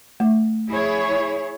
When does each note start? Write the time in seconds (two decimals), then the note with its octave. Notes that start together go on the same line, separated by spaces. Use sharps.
0.20 A3
0.69 E4 G#4 C#5